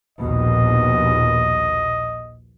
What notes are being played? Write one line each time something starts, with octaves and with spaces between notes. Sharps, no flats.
A#1 D#2 B2 D#5